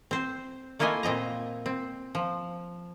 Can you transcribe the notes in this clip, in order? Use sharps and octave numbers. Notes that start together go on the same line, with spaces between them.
C4 C5
A3 A#3 E4 F4 D#5 G#5
A#2 C4 D#5 A#5
C4
F3